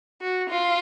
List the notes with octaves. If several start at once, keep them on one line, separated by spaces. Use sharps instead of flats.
F#4
F4